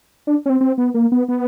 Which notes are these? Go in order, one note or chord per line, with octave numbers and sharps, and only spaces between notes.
D4
C#4
C4
C4
B3
A#3
B3
B3